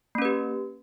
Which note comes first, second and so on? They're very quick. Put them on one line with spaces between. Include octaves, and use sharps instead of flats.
A#3 C#4 B4 G4